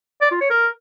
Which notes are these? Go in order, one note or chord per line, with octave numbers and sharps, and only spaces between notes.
D5
F4
C#5
A#4